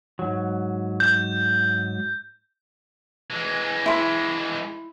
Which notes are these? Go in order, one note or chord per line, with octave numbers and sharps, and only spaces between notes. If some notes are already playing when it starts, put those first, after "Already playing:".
G#2 F#3
G6
E3 G#3
E4 C6